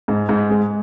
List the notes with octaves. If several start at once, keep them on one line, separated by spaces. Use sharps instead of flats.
G#2
G#2
G#3